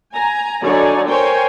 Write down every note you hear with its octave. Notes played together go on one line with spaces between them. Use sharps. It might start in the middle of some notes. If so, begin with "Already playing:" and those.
G#5 A#5
D3 F#3 D#4 C#5 D5 G#5
A#4 C5 C#5 G5 G#5